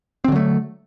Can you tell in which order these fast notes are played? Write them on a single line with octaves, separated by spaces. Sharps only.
C4 D3 F#3 A3